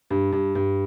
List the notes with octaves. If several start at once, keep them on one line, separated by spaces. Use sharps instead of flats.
G2
G2
G2